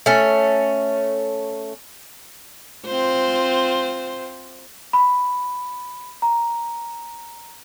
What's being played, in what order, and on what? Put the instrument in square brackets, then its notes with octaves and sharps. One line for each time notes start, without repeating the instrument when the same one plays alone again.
[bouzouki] A3 C#4
[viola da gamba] C4 F4 C5
[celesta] B5
A#5